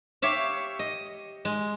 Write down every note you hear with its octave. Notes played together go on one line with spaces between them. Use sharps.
G4 C#5 E5 F5
D#5
G#3